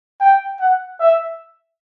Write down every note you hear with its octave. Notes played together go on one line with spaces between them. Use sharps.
G5
F#5
E5